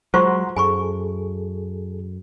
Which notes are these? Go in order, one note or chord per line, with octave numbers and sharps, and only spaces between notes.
F#3 G#3 F4 C5 F#5 A#5 C6 C#6
F#2 G#4 A4 G#5 B5 C#6